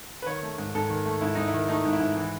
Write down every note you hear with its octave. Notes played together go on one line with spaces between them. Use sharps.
B4
D#3 C#5
A3
G#2
G#2 A4
D#3
A3
G#2 E4
G#2 D#4
E4
D#3
A3 D#4
G#2
E4
G#2
E3